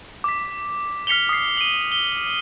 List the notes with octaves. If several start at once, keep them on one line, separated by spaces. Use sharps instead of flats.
D6 B6
F6 B6 C#7 F7 G7
D#6 C7
D#7 F#7
G7